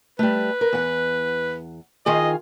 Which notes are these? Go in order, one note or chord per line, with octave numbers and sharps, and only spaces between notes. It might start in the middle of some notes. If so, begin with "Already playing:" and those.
G3 A3 B4
A#4
E2 F#5
D#3 F4 G#4 D#5